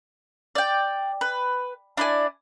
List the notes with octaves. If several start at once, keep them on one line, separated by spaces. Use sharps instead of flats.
D5 G5
B4
D4 E4 D5 G#5